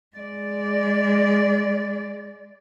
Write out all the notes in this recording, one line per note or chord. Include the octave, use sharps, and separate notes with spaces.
G#3 D5